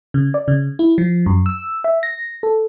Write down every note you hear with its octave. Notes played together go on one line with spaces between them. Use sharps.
C#3
D5
C#3
E4
F3
F#2
E6
E5
A#6
A4